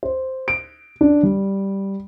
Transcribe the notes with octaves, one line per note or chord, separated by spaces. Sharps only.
C5
D7
D4
G3